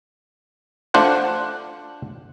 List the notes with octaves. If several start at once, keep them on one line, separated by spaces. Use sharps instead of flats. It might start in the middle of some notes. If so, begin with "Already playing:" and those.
A3 D4 F4 C5 F#5